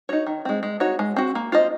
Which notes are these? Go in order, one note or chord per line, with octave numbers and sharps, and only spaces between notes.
D#4 F#4 C#5
D#3
G#3 C4
G#3
D#4 F#4 C#5
G#3
C4 F#4
A#3
F4 C5 D#5